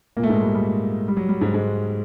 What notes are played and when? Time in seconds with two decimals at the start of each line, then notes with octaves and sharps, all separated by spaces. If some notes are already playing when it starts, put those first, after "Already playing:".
0.17 A#2 A#3
0.23 A3
0.29 G#2 G#3
0.42 G3
0.54 G3
1.08 G3
1.17 F#3
1.29 G3
1.41 G#2 G#3
1.54 G#2 G#3